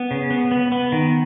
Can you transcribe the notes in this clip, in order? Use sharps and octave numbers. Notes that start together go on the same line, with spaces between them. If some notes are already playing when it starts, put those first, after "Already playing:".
Already playing: B3
C#3
B3
B3
B3
D#3